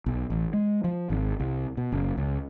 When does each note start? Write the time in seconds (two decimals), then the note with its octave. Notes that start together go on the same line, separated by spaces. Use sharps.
0.06 B1
0.30 A1
0.53 G#3
0.84 F3
1.10 G#1
1.40 C2
1.77 B2
1.92 F#1
2.17 C#2